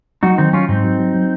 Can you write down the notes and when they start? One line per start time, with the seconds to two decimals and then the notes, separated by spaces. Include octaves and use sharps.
0.23 F#3 D#4 F#4
0.38 D#3 C4 D#4
0.53 F#3 C#4 F4
0.69 G#2 C4 D#4
0.84 F#3
1.00 F#3
1.15 F#3